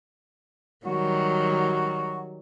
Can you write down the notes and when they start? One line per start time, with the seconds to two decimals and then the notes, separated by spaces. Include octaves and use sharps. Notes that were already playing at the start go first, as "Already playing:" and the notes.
0.86 D#3 F#3 G3 F#4